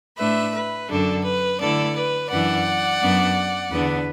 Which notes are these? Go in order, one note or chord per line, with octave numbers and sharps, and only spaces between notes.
A2 A3 D4 B4 E5
B4
F#2 D3 F#3 D4 A4
B4
D3 A3 E4 A4 D5
B4
F#2 E3 D4 D5 F#5
F#2 F#3 B3 D4
E2 D3 B3 D4 B4